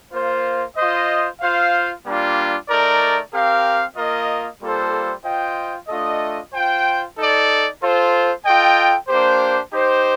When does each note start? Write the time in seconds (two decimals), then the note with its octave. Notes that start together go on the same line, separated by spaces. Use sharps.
0.13 A#3 F4 C5
0.76 F4 C5 D#5
1.41 F4 C5 F5
2.04 G3 A#3 D4 F4
2.69 A3 D#4 A#4 D5
3.32 C4 G4 A#4 F5
3.96 A#3 F4 A#4 D#5
4.61 G3 A#3 F4 A4 C5
5.25 F4 C5 D#5 G5
5.88 A3 D4 F4 A4 D#5
6.53 F4 C5 G5
7.16 D#4 A4 D5
7.80 F4 A4 C5
8.44 F4 A4 D#5 G5
9.08 A#3 D4 G4 C5
9.72 D#4 G4 C5